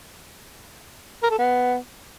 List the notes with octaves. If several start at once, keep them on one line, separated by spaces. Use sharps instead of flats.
A#4
A4
B3